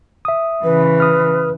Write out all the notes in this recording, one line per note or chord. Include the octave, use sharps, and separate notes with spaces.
E5 D#6
C#3 E3 B4
D#6 F6